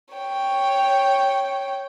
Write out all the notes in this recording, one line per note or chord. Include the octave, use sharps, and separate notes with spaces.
C#5 G5